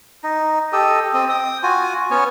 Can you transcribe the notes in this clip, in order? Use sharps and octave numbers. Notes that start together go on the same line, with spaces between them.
D#4
G4 A4 D#5
C4 D#5
G5 D#6
F4 F#4 G#5
B3 C#4 C#5